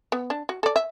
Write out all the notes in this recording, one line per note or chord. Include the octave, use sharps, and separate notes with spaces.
B3
D4
F#4
A4 D5
E5